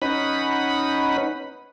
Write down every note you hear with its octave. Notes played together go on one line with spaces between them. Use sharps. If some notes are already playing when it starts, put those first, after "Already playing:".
C#4 D#4 B4 F#5 B5